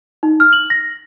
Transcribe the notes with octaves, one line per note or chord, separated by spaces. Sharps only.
D#4
F6
F#7
A#6